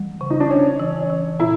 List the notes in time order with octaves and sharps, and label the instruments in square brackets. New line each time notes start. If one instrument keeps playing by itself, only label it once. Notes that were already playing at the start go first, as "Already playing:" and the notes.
Already playing: [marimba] E3 G3
C#3
[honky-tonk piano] D#4
D4
[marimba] C#3 [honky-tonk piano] C#4
[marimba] E3
E3
[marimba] A#2 [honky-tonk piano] E4